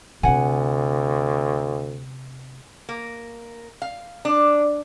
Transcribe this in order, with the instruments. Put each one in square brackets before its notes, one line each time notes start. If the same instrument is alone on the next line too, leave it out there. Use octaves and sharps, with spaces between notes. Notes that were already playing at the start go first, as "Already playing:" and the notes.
[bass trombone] D2 [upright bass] C3 C4 [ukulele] F#5 G#5
[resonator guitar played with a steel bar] A#3
F5
D4